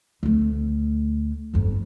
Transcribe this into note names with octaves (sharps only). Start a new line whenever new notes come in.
D2 A3
G1 F2